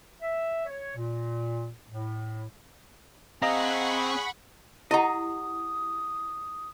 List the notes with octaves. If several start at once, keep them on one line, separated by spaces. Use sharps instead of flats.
E5
C#5
A#2
A2
C4 G#4 D#5 F5 F#5 A#5 B5 C#6
E4 G4 D#5 F#5 A#5 D#6